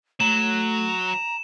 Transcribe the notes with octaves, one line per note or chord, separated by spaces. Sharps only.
F#3 A3 A#5 E7